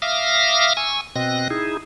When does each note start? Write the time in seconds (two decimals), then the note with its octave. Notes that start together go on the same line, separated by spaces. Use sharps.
0.02 E5 F5 D6 D#6 F6 A#6
0.77 G#5 C#6 E6
1.16 B2 C4 D#5 F#6 A#6
1.50 D#4 E4 G#4